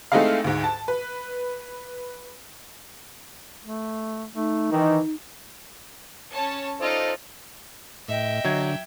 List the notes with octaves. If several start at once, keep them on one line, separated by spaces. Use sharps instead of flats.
G#3 A3 C4 D#4 E4 F5
D2 G#2
A5
B4
A3
A3 D#4
D#3 E3
C#4 C#5 A5
D#4 F4 A4 C5 D5 D#5
A2 D#5 E5 G5
D3 F#3 G#6